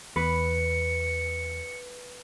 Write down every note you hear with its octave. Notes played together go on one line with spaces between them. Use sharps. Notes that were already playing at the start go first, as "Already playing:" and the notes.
E2 B4 C#7